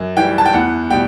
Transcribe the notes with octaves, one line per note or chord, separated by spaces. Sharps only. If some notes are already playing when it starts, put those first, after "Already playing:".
Already playing: F#2
E3 G3 G5
A5
G5
E2 F#5
B2 G3 G5